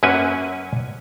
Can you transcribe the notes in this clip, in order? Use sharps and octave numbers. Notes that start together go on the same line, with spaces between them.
F#2 F#3 A#3 C#4 B4 G#5